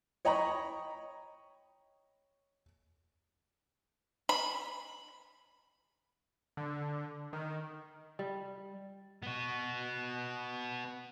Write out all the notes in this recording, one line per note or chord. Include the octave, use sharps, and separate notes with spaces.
C#5 D#5 G5 A#5 B5 C#6
B5
D3
D#3
G3
B3 F#4